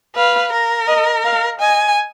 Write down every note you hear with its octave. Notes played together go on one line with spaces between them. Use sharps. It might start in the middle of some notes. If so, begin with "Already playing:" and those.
B4 F5
A#4
D#5
F5
D#5 G#5